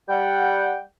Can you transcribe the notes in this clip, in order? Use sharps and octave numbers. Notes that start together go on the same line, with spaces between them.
G3 F#5 G5